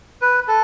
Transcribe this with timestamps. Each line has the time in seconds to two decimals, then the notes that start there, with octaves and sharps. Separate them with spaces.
0.22 B4
0.48 A4